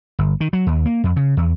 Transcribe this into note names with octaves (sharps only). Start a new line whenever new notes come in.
G1
D#3
F#3
D#2
A#3
F2
C#3
E2